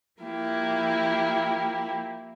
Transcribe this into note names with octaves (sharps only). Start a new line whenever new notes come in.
F3 A#3 E4 G4